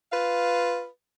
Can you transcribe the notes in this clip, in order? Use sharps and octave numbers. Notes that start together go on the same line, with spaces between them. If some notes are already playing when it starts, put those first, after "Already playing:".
F4 B4 F5